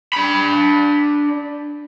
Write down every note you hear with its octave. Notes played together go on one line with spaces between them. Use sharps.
D4 B5